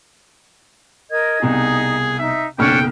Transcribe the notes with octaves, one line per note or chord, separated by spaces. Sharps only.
A#4 D#5 G#6
C2 B2 D#4 G#4
D#4 E5
F#1 B1 C#4 D4 G5 F6